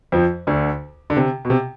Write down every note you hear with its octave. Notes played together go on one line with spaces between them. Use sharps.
F2 F3
D2 D3
D3
C3
B2
C3